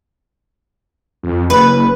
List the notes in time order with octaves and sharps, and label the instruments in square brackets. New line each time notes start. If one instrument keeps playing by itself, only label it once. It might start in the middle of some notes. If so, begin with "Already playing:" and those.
[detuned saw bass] F2
[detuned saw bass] F#1 [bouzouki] B4